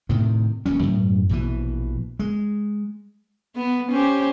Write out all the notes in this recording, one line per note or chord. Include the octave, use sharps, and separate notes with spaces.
A2 C3 D#3
D#1 D2 G3 C#4
F#2 A2
A#1 B2 D3 E3
G#3
B3
C#4 G4 C5